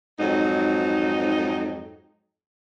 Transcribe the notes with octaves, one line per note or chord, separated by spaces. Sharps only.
F2 G#2 F#3 D#4